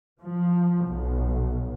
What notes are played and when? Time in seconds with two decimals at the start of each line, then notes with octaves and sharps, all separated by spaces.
0.19 F3
0.89 B1